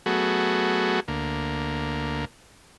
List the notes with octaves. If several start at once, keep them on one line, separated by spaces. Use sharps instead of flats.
F#3 A3 B3 F#4 G#4
D2 A#3